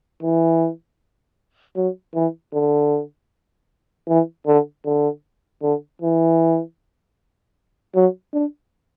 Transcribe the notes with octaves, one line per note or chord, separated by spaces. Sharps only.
E3
F#3
E3
D3
E3
D3
D3
D3
E3
F#3
D4